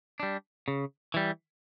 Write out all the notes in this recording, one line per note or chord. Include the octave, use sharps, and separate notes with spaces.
G3 D4
C#3
E3 G3